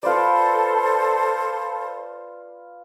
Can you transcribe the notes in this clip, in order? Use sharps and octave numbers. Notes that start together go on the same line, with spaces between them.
F4 A4 B4 C5 D5